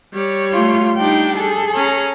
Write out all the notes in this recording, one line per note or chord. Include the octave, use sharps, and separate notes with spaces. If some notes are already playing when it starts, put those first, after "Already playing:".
G3 C#5
A3 F4
G3 D4 D#4 G5
G#4 A4
C#4 A#5